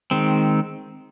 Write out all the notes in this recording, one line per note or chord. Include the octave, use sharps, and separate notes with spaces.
D#3 G#3 C4